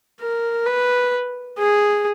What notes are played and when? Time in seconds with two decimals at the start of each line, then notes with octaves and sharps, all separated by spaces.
0.21 A#4
0.66 B4
1.59 G#4